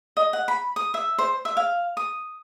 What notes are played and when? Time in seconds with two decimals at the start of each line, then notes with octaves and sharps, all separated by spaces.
0.17 D#5
0.33 F#5
0.48 B5
0.76 D#6
0.94 E5
1.18 C5
1.45 E5
1.57 F5
1.97 D#6